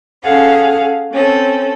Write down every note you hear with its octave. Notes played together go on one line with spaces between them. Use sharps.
C#4 G#4 A4 F5 F#5
C4 C#4 A4